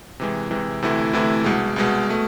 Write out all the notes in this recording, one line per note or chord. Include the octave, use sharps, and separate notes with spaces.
C3 E3 G#3
C3 E3 G#3
D2 C3 E3 A3 E4
D2 C3 E3 A3 E4
C2 B2 G#3
C2 B2 G#3
B2 A3